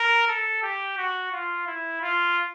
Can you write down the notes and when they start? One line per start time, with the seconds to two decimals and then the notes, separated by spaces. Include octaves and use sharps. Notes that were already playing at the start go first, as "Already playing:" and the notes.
Already playing: A#4
0.28 A4
0.62 G4
0.97 F#4
1.32 F4
1.67 E4
2.02 F4